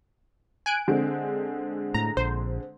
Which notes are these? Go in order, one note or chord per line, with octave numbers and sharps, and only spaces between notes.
G#5 F#6 D7
D3 G#3 C4
A2 A#5
A#1 C5